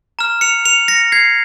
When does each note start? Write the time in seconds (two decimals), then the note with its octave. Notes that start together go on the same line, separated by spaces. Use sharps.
0.19 A#5 F6
0.41 C#7 F7
0.65 C#7 F7
0.88 A#6 C#7
1.12 G#6 C7